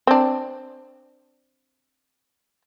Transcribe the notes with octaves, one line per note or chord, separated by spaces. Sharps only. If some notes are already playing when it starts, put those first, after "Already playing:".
C4 D4